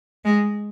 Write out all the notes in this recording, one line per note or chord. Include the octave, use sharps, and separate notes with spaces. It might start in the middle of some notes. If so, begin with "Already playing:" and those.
G#3